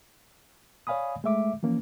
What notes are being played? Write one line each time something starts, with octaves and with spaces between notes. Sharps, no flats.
C#5 D5 F5 G#5 B5 D#6
G#3 A3 E5 D6
E3 F3 A#3 C#4